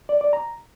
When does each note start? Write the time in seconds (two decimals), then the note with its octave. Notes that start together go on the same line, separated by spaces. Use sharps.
0.09 D5
0.21 D5
0.33 A#5